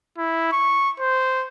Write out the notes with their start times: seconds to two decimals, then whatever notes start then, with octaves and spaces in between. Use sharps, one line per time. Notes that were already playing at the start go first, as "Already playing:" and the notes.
0.18 E4
0.52 C#6
1.00 C5